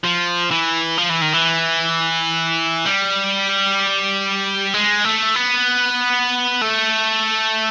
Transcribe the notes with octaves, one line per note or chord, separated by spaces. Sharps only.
F3
E3
F3
E3
D#3
E3
G3
G#3
A3
B3
A3